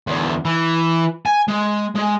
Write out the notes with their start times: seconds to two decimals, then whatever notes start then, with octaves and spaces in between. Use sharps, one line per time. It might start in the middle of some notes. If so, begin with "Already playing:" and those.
0.07 E2 D3
0.45 E3
1.26 G#5
1.48 G#3
1.96 G#3